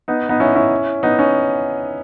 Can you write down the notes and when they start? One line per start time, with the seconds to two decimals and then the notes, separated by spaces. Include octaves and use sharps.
0.08 B3 D#4
0.29 B3 D#4
0.40 C#4 E4
0.55 C#4 E4
1.03 B3 D#4
1.19 C#4